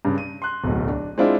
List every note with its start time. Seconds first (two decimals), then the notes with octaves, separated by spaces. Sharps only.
0.05 G2 C#3
0.18 D#7
0.42 C6 F#6
0.64 D1 B1 A3
0.88 D4
1.18 G#3 C4 D4 E4 F4